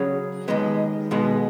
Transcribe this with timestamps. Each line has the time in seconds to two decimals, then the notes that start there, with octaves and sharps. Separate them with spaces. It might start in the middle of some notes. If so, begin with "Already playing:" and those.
Already playing: C#3 F#3 C#4 G#4 C#5
0.48 D#2 D#3 G#3 B3
1.11 B1 B2 G#3 B3